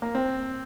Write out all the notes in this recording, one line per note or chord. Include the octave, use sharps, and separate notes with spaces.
A#3
C4